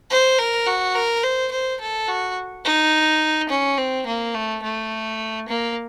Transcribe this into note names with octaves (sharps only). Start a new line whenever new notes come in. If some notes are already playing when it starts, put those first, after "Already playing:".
C5
A#4
F#4
A#4
C5
C5
A4
F#4
D#4
C#4
C4
A#3
A3
A3
A#3